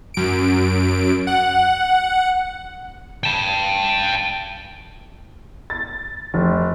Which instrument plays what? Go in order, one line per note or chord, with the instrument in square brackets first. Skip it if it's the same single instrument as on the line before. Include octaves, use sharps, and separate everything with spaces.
[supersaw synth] F#2 D7
F#5
[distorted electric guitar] G5 A5
[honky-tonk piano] A6
F1